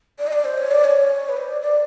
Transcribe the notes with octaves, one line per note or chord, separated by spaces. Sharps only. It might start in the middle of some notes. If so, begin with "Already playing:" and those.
D5
D#5
D5
C5
C#5
D5
C#5
B4
C5
D5
D5